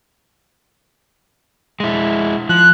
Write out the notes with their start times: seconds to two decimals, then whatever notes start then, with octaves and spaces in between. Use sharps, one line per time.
1.80 G#3 E4
2.49 F3 F#6